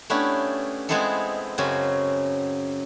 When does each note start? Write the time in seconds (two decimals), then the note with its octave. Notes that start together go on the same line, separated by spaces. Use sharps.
0.10 A3 B3 C#4 D4 E4 G4
0.89 G#3 B3 C4 E4 G#4 A4
1.58 F#2 C#3 F#3 C4 C#4